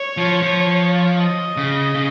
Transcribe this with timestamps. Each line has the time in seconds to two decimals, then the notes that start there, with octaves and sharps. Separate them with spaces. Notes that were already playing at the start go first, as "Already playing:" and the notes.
Already playing: C#5
0.17 F3
0.42 F3
1.18 D#5
1.56 C#3
1.95 C#3